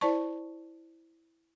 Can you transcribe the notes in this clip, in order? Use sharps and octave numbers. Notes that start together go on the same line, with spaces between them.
E4 C5 D5 A5 C#6